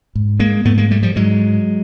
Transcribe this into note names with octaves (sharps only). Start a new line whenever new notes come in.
G#2
G#3 A#3
G#2 A3 B3
G#3 A#3
G3 A3
F3 G3
G#2 F#3 G#3